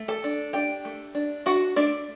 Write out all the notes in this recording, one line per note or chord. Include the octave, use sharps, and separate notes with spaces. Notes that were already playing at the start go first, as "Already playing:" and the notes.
Already playing: A3
A4 A5
D4
D4 G4 G5
A3
D4
D4 F#4 F#5
A3 D4 D5